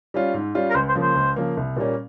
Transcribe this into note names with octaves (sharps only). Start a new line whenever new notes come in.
G3 C#4 F4
G#2
G3 C#4 F4
A#4
C#2 C5
C5
C#3 F3 A#3
C5
C#2
C#3 F3 A#3
C2
A#2 G3 A#3 C#4